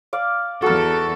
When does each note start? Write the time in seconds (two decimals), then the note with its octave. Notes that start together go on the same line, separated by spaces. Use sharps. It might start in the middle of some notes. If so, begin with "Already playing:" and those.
0.13 D5 F5
0.62 E2 F#4 A4 A#4